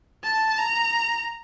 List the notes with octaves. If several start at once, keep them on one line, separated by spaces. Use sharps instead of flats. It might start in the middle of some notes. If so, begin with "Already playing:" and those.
A5
A#5